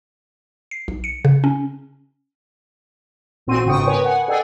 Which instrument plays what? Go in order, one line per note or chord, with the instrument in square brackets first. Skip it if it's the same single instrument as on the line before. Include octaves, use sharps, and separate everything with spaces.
[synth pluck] C7
B1
C#7
C#3
C#4
[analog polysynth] A1 A#2 C4 F#4 C6 D#7
G1 G#2 C#3 G5 C#6 D#6
A#4 B4 C#5 G#5
F#5 G#5
G#4 A4 D5 D#5 G5 G#5